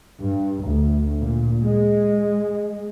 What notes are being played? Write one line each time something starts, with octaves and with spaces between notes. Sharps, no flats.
G2
D2
A#2
G#3